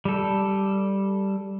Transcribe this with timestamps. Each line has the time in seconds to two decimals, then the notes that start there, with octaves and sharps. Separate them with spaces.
0.05 G3 A4